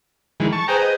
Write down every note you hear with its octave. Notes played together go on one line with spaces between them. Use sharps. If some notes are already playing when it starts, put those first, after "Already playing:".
D#3 E3 G#3
A5 C#6
G#4 B4 C5 G5 A#5
D#5